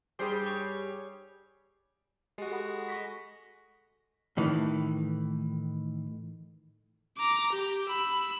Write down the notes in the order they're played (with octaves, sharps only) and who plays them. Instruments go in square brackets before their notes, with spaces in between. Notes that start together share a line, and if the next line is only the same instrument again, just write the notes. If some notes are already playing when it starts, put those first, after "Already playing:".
[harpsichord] G2 G4 [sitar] G3 G#4 [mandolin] C5 G5 B5
[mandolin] C#5
[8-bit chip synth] G#3 F#4 [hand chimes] G4
[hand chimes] A4 F#5 B5
C#6 A#6 B6
[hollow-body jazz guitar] A2 D#3 E3
[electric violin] A#5 D6
G4
B5 E6